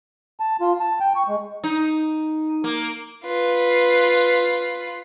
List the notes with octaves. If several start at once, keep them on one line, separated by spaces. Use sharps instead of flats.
A5
F4
A5
G5
C#6
G#3
D#4
A#3
F4 B4